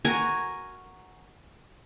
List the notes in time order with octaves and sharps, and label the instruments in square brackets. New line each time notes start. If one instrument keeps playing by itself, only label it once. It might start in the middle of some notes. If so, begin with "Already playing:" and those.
[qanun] F#4 A#4 G#5